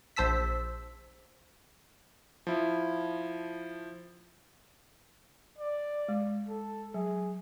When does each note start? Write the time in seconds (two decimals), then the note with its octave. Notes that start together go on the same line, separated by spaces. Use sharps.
0.16 A#1 C5 A5 E6 B6
2.47 F3 E4
5.59 D5
6.09 G#3
6.49 A4
6.94 F#3 G#4